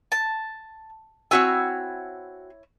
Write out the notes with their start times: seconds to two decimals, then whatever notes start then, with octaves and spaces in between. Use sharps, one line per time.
0.12 A5
1.31 C4 E4 F#4 C#5 G#5 E6